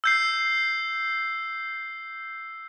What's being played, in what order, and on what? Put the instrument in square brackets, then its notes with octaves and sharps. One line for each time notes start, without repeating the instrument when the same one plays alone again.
[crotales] E6 G6 C7